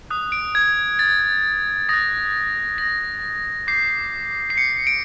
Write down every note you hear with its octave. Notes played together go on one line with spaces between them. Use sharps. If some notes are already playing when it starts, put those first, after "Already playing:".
D#6 F#6
D7
G#6
A6
D#6 F#6 A#6
A#6
D6 G6 C7
C7
C#7
D7